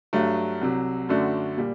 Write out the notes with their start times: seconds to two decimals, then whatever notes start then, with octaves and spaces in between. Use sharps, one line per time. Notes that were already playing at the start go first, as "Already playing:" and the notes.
0.13 G2 F#3 A3
0.61 C2 C3 F#3
1.09 F#2 D3 A3 D4 F#4
1.57 A#2 G3